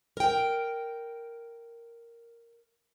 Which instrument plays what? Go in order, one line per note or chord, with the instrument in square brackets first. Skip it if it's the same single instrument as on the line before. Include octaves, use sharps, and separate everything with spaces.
[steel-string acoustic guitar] A#4 G5